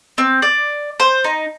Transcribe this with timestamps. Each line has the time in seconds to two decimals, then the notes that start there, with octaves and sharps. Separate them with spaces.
0.18 C4
0.42 D5
1.00 C5
1.24 D#4